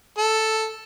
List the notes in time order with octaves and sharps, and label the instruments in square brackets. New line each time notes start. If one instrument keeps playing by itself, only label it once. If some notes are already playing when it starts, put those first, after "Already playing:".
[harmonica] A4